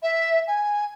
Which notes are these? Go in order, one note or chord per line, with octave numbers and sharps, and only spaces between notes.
E5
G#5